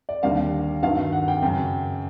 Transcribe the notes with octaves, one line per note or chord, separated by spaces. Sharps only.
D5
D#2 D3 G3 F5
G2 D#3 F#3 F5
F#5
G5
F#2 C#3 F#3 G5